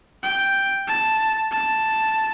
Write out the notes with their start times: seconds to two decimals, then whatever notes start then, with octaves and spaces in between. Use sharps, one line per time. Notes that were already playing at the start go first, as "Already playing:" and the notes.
0.23 G5
0.88 A5
1.52 A5